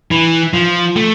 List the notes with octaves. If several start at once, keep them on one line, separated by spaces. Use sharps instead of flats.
E3
F3
A3